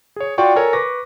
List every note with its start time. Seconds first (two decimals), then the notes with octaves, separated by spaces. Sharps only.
0.16 G#4 C#5
0.38 F4 F#4 D5 G5 C#6
0.56 A4 A#4 C#5 G#5
0.73 B4 C#6 D6 A#6